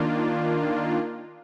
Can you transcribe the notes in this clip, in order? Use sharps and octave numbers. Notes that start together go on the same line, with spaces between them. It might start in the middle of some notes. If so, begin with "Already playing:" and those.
Already playing: D#3 A#3 D4 F4